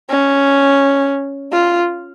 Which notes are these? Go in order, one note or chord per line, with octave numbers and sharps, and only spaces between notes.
C#4
F4